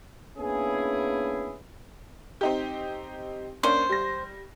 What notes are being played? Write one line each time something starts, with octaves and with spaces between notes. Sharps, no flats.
A#3 B3 C#4 D4 E4 G#4
C4 D#4 G4
A#3 C#4 D4 C5
G3 A#6